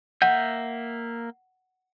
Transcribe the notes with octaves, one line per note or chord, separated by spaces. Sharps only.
A#3 E5 F#5 G6